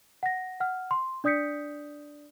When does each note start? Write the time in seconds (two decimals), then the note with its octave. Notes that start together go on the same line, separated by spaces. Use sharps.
0.23 F#5 A#6
0.60 F#5 F6
0.91 C6
1.24 D4 D5 D#6 G6 B6 C#7